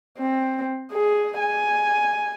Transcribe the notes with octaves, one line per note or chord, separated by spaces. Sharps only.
C4
G#4
G#5